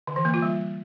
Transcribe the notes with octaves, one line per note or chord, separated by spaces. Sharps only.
D3
E3
A#3
F4
G3